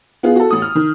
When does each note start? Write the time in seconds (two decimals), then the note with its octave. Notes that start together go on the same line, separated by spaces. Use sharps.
0.23 B3 F4 G#4
0.36 F#4 A4
0.51 A1 D#6
0.62 F6
0.75 D#3